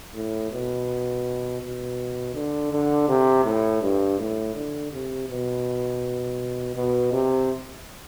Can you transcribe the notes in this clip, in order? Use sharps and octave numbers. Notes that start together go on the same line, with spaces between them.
A2
B2
B2
D3
D3
C3
A2
G2
A2
D3
C3
B2
B2
C3